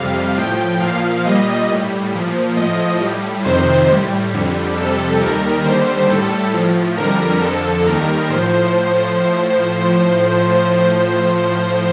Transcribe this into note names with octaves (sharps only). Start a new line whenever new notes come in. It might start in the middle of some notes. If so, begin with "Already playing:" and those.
Already playing: F2 C3 G3 F5
A2 F3 G5
A#2 F3 F5
A#2 G3 D#5
A2 G3
A#2 F3
A2 F3 D#5
A2 G3
F2 C3 D#3 C5
A2 G3
F2 D3 G3
F2 C3 G3 A4
D#2 D#3 G3 A#4
D#2 D3 G3 C5
A2 G3 A4
A2 F3
F2 D3 G3 A#4
F2 D3 F3 A4
D#2 D#3 G3 A#4
A2 F3 C5